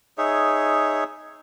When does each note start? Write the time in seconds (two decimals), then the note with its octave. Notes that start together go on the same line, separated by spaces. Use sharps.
0.18 D#4 G#4 C#5 E5